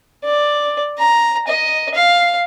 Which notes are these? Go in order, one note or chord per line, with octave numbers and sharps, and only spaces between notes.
D5
A#5
D#5
F5